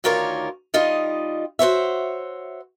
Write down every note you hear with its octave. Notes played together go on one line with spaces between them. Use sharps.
D2 D#3 F4 A#4 C#5 D5
G3 D#4 F4 D#5
F#4 C5 C#5 E5